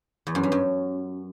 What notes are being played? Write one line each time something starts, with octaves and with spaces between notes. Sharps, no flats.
E2
F#2
G2
F#2